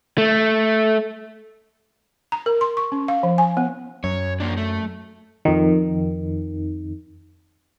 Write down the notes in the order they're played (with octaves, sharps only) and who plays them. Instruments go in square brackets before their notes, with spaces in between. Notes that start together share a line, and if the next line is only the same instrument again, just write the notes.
[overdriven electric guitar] A3
[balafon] A#5
A#4
C6
C#6
C#4
F5
F3
G#5
B3
[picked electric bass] F#2 [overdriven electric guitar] C#5
[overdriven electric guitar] A#3 D4
A3
[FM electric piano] F2 D#3